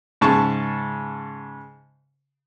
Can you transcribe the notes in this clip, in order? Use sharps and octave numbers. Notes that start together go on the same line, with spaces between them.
G#2 C#3 A5 C#6